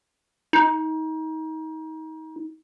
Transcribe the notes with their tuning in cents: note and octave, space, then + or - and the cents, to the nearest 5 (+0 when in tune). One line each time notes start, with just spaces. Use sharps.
D#4 +30